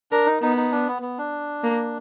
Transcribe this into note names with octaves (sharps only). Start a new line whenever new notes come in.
D4 A#4
D#4
B3 D#4
D#4
D4
B3
B3
D4
A#3